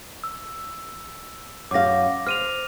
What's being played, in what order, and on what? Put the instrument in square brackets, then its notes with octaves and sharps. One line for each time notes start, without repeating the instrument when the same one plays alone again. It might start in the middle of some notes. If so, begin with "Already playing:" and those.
[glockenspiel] E6
[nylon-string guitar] F#2 F5 [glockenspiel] D6 A#6
[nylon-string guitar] C5 [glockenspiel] F6 D#7 F7